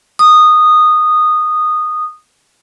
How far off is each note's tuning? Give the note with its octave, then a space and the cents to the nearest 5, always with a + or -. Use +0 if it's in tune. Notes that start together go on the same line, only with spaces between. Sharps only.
D#6 -15